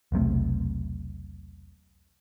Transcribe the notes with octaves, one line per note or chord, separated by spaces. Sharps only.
E1 B1 C3 A3